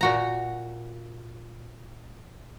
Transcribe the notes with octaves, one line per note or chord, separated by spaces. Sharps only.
A#2 F#4 A#5